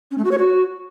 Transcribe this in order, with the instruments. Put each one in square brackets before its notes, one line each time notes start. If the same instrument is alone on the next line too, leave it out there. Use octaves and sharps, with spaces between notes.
[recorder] C#4
A3
F#4
C#5
F#4